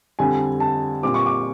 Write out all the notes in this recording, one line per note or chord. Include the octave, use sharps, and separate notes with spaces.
F2 D3 G3 G#5
A5
A#2 G3 C4 D6
C#6
D6